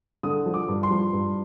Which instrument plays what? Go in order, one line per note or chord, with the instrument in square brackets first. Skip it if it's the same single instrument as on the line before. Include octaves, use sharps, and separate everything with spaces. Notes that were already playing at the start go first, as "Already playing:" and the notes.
[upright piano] D3 D#6
F3
D6
G2
C6
F3
G2